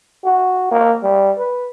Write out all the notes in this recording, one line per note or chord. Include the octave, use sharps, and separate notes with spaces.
F#4
A#3
G3
B4